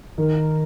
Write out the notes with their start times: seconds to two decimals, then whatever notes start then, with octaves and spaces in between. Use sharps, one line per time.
0.17 D#3 A#4